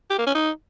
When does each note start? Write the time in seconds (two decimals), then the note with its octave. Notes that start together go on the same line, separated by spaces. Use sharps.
0.10 G4
0.18 A#3
0.27 C#4
0.35 D#4